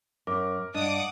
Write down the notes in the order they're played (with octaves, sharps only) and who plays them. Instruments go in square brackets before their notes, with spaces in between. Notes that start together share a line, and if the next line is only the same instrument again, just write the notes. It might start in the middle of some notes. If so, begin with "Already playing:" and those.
[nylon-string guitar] F#2 [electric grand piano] A#4 [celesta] D6
[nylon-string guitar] G2 [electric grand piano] D4 [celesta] D#5 [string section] F#5 D6 D#6